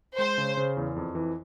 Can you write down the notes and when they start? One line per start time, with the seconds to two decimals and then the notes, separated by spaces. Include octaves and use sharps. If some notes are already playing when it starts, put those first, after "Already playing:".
0.18 G#3 C5
0.38 C#3
0.57 C#3
0.77 E2
0.96 F2
1.15 E3